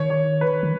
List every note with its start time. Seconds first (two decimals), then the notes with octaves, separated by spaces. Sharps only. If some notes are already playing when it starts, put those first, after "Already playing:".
Already playing: D#3 C#5
0.10 C#5
0.41 B4
0.63 D#3